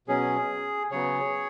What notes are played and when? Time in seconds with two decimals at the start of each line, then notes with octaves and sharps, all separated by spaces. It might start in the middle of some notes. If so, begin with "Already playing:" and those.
0.08 B2 F#3 C#4 G#4
0.91 C#3 F#3 B3 G#4 C#5